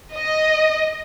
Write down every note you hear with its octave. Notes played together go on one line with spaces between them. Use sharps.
D#5